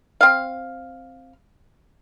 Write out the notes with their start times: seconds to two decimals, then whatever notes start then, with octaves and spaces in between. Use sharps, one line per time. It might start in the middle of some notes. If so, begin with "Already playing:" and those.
0.21 C4 F5